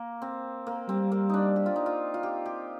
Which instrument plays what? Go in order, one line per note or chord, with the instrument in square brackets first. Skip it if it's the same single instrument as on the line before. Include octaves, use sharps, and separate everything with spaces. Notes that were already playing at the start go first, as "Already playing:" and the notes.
Already playing: [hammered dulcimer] A#3
C4
A#3
[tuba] G3 [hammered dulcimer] C4
[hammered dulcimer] A#3
D4 D#4
G4
F4
D#4
F4
F4
G4
G4